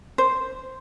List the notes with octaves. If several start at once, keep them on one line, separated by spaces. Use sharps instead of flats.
C5